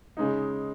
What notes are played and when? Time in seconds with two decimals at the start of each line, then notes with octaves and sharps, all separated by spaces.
0.17 C#3 G#3 D#4